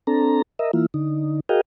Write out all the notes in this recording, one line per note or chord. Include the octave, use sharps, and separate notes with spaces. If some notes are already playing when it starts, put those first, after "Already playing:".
C4 D4 A4 A#5
A#4 D#5 E5
E3 A#3 E4 F4
D3 D#4
F#4 G#4 A#4 D#5 F5 G5